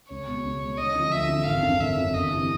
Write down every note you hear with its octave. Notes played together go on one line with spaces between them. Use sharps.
C#2 C#5
B2 G#3
C#2
B2 G#3
D2 D#5
D3 F3
D2 E5
D3 F3
G#1 F5
F#2 D3
G#1 E5
F#2 D3
G1 D#5
F2 C3 E3